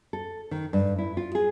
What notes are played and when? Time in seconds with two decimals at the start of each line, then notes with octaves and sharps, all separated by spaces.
0.13 A4
0.51 D#3
0.73 G2
0.98 E4
1.17 F4
1.35 G#4